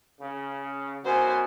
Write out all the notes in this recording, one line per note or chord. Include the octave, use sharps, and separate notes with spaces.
C#3
F#2 B2 F#3 C5 G#5